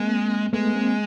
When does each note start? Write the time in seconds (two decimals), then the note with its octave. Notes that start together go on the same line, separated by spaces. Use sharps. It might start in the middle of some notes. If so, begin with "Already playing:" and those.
Already playing: G#3 A#3 C4
0.53 G#3 A3 B3
0.75 A#3 C4